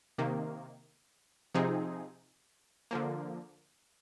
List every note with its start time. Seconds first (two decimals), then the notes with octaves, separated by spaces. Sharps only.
0.18 C3 D#3 A#3
1.54 C3 F3 C4 D#4 G#4
2.91 D3 F3 A#3